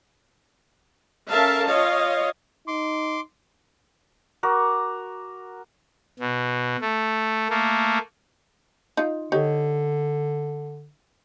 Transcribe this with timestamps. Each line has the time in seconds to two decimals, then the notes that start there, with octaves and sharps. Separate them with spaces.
1.30 C#4 A4 A#4 E5 F5 A5
1.68 F4 C#5 D#5 F5
2.68 D#4 C6 D6
4.43 F#4 A#4 D6
6.19 B2
6.81 A3
7.50 A3 A#3
8.97 D#4 F4
9.32 D3 D#4 G4 C#5